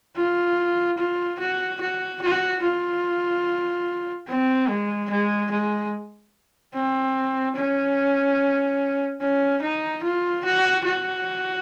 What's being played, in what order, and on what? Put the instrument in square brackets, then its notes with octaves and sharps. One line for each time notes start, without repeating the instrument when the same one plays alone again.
[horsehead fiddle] F4
F4
F#4
F#4
F#4
F4
C4
G#3
G#3
G#3
C4
C#4
C#4
D#4
F4
F#4
F#4